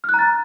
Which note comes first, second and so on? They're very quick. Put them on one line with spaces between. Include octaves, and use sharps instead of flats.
F6 F#6 A#5 A6